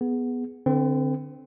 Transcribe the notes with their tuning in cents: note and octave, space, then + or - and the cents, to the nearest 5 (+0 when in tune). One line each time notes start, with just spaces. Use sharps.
B3 +0 G#4 +0
D3 +0 C4 +0 B4 +35